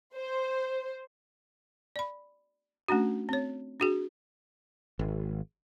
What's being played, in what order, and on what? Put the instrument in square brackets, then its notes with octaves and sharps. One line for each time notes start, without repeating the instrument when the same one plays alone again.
[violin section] C5
[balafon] D5 B5
A3 C#4 D4 F#4
C4 C#5
D4 F#4 G#4
[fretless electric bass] G#1